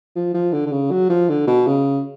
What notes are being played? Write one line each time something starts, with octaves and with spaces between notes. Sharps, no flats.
F3
F3
D3
D3
C#3
F#3
F3
D3
B2
C#3